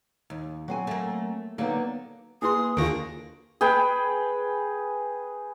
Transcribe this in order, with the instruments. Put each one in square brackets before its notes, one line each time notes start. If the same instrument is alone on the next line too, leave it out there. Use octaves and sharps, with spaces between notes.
[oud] D#2
[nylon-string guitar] F#3 C4 G#5
[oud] A3 A#3
[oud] D3 D#3 F#3 [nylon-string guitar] A#3 B3
[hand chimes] A#3 E4 B4 [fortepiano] G#4 C6 [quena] D#6
[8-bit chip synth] D#2 D3 A#6 [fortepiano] A#3 F4 G#4 [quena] C#6 [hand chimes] D7
[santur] G#4 B4 G5